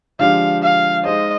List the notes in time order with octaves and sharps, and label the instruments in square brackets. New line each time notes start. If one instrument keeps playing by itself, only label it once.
[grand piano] D3 F3 G#3 D4 G4 [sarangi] F5
[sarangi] F5
[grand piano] G#3 D#4 G#4 C5 [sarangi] D#5